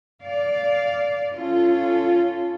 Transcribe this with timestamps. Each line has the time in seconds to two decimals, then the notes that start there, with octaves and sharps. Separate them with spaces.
0.20 D5 F5
1.33 C#4 F4 A4